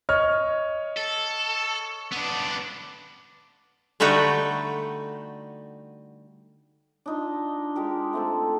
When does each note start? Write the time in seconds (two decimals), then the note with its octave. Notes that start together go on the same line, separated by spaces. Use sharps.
0.09 C#5 D#5 F6
0.97 A4
2.12 B3 D4
4.00 D3 G3 A3 D#4 F#4 G5
7.06 D4 D#4 F4
7.76 G#3 F4 G4 A#4
8.13 A3 C4 A4